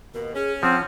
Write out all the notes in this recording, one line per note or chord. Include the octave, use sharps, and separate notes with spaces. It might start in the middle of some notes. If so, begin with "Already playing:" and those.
D#2 B2 A#4
C#4 G#4
F3 C4 F#5